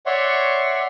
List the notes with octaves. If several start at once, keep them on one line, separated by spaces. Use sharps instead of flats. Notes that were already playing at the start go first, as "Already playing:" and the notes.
C#5 D5 E5 F#5 C6 C#6